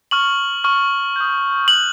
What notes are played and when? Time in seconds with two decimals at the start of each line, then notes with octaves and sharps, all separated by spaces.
0.11 C#6 F6 F#7
0.64 C#6 F6
1.16 D#6 G6
1.68 C#6 F#6 F#7